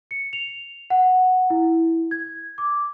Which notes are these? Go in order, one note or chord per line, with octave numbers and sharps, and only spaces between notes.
C#7
F7
F#5
E4
G#6
D6